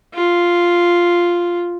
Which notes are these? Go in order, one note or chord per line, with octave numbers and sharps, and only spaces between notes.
F4